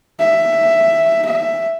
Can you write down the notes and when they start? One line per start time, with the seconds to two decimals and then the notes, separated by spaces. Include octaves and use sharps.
0.20 E5
1.26 E5